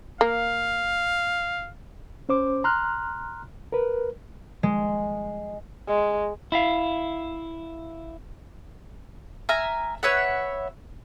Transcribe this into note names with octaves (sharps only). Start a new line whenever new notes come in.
A#3 F5
C#4 C5 D6
A#5 C6 F6 F#6
A#4 B4
G#3
G#3
E4 E5 F5
E5 G#5 A#5 F6
B4 C#5 E5 F#5